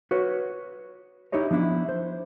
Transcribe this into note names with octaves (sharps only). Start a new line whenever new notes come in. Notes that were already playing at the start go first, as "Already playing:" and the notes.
F#4 B4 C#5
D#4 E4 G4 C#5 D#5
F3 B3 D4 E4
C5